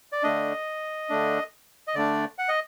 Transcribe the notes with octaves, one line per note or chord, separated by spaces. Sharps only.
D5
D3 A3 D4 D#5
D3 A3 D4
D#5
D3 A3 D4 D5
F#5
D#5